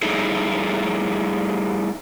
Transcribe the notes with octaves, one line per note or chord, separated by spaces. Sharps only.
G3 A3 D#4 E4 G#4 A4